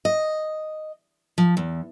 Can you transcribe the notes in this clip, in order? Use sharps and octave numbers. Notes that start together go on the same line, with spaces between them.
D#5
F3
E2